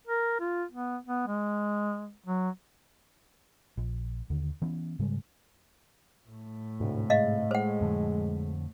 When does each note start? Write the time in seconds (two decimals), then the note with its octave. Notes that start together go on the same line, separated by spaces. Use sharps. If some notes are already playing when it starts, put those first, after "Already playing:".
0.07 A#4
0.40 F4
0.72 B3
1.07 B3
1.27 G#3
2.26 F#3
3.77 A#1
4.30 D#2 D3
4.62 E3 B3 C#4
4.99 G#2 C#3 G3 G#3
6.28 A2 A3
6.80 D2 G#2 C3
7.10 G#3 D#5 F5
7.51 G#3 C5 F#5
7.81 F2 D3 F3